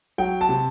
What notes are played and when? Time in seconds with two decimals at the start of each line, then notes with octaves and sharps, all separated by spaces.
0.18 F#3 G5
0.41 A5
0.49 C3